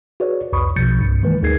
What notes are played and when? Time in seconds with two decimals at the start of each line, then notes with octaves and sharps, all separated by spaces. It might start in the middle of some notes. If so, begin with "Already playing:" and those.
0.20 F#4 G#4 B4 C#5 D5
0.53 C2 F2 B4 B5 C#6 D#6
0.76 B1 B2 F3 G6 A6 C#7
1.01 C2 G2
1.23 D#3 E3 G#3 A#3 B4
1.42 D2 D#4 G#4 A#4 G#6 C7